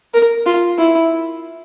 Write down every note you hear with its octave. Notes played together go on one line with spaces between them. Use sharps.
A#4
F4
E4